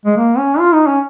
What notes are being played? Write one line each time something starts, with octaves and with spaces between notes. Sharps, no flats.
G#3
A#3
C#4
F4
D#4
C#4